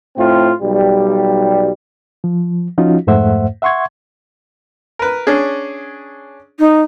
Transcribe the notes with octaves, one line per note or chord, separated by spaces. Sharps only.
A2 C4 F4
B1 G3
F3
F3 C#4 D#4 F4 F#4
F2 G#2 A3 C5 E5 F#5
E5 F#5 C6 C#6 G#6
A#4 B4
C#4 D4 G#4
D#4